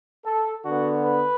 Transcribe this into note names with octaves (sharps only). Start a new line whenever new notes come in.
A4
D3 B3 F#4
B4